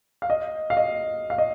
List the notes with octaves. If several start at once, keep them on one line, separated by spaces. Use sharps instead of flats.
F5
D#5
F5
D#5
F5
D#5